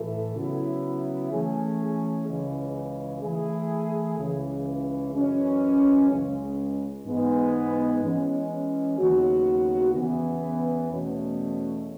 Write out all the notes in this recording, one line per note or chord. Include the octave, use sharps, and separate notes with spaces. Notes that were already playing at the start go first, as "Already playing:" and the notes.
Already playing: A2 E3 A3 E4 A4
C#3 F#3 B3 E4
E3 A3 C#4 G#4
C#2 C#3 E3 G#3
E3 A3 E4 G#4
C#2 C#3 E3
F#2 E3 G#3 C#4
C#2 C#3 G#3
G#2 E3 G#3 B3
E3 G#3 C#4
D#2 C#3 F#3 B3 F#4
E2 C#3 E3 B3
E2 B2 A3 C#4